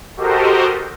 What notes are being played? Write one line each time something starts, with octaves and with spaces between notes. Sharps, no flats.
F#4 G4 A4 A#4 C5 D#5